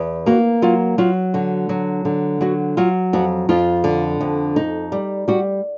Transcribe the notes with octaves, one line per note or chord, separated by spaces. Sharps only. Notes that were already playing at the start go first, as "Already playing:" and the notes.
Already playing: E2
A#3 F#4
F#3 F4
F#3 F4
D3 F#4
F#3
D3
F#3 F#4
F#3 F4
F2 F#4
F2 F4
D3
F2
D#4
G3
G3 F#4